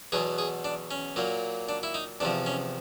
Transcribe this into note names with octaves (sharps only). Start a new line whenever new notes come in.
E2 B2 F#3 G#4
G#4
D4
C#4
A#2 F#3 A#3
D4
E4
D#4
E2 C3 F3 D4
C#4